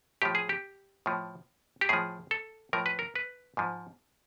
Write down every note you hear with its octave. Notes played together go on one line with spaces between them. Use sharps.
A2 F3 G4
G#4
G4
A2 F3
G4
A2 F3 G#4
A4
A2 F3 A#4
B4
A#4
B4
G#2 F3